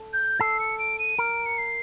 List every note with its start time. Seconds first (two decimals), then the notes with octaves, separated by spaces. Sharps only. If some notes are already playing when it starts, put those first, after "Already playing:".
Already playing: A4
0.13 G6
0.40 A4 C7
0.60 C#7
0.79 D7
0.99 D#7
1.19 A#4 D7
1.46 C#7
1.58 C7